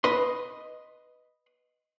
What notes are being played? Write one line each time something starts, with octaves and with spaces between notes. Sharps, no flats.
B4 D#5 C6